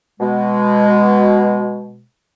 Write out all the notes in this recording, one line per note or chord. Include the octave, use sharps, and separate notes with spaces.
B2 G#3